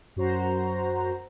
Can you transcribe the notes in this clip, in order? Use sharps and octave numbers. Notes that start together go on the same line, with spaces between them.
F#2 F#4 C5 A#5